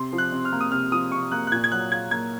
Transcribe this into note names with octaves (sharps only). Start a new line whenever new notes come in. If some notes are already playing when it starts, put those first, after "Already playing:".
Already playing: C3 C6
F3
F#6
C3
F6
A#3
D#6
C3 F6
F3 D#6
C3 C#6
A#3 F#6
F#6
A#2 G#6
G#6
F#3 F#6
F4 G#6
A#3 G#6